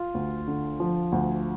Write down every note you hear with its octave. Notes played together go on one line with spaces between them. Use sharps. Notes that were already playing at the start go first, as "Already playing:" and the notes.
Already playing: F4
D2
D3
F3
D2